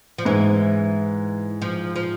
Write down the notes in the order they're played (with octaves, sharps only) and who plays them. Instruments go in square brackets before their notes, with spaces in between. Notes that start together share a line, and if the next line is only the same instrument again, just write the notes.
[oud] F3
[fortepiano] G#2 [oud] E3
[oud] F3
F3